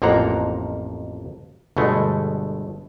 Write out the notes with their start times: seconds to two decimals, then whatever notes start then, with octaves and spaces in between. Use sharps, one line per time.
0.02 A1 F2 F3 A#3 F#5 A#5
1.77 G1 B2 G#3 A3